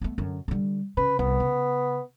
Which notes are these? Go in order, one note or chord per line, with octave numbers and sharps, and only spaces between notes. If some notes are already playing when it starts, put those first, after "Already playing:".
A3 B3
F#2 D3
D3 G3
C#3 B4
C2 B3
C#3